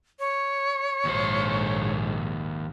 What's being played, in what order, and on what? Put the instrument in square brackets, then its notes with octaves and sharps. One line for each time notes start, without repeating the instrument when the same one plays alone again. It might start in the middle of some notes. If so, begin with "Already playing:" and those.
[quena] C#5
[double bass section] A#1 G#2 [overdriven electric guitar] D#2 C5